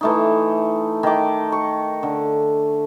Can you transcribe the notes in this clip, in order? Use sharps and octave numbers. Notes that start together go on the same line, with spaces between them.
E3 A3 D#4
D#3 D6
C#6
D3